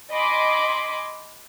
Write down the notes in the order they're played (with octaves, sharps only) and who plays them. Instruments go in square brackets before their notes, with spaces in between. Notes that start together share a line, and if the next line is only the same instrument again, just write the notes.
[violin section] D#5 G#5 B5 C6 D6